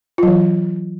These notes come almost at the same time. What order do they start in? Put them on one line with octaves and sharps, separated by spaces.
F4 F#3 E3